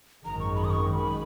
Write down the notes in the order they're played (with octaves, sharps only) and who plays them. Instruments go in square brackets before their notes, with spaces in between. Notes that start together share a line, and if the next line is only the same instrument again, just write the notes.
[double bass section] G#1 F#2 D#3 G#3 [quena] A#5
[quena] C#6
B5
D#6
C#6
B5